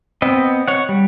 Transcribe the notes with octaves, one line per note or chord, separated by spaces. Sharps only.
B3 C4 D#5
C#5 F#5
G3